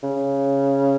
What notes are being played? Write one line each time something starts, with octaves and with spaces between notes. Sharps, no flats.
C#3